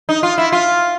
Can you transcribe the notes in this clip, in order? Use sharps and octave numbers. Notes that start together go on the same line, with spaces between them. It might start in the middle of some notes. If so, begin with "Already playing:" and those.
D#4
F4
E4
F4